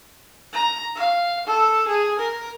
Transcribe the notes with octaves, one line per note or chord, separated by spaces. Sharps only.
A#5
F5
A4
G#4
A#4